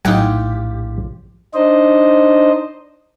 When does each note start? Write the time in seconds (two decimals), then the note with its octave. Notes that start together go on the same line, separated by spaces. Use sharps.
0.05 A#1 A2 F#3 D#4 F4 G4 F#5 G#5
1.54 D4 D#4 C5 D#5